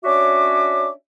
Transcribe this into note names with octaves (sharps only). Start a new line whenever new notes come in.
C#4 D4 F#4 C#5 E5 D6